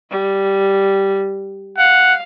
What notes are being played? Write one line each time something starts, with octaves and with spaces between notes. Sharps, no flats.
G3
F5 F#5